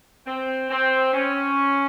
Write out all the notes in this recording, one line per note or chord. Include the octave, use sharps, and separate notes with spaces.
C4
C4
C#4